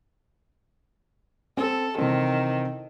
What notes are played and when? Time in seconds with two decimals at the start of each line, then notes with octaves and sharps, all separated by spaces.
1.57 C4 A4
1.98 C3 D#3 E3 C4